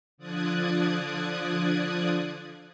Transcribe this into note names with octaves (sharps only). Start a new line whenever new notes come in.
D3 F3 D5 D#6 F#6 G#6